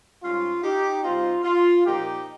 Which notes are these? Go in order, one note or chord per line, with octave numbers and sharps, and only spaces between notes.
G#2 G3 C#4 F4
D#4 G4
C3 G3 C4 D#4 F4
F4
A#2 F3 A#3 D#4 G4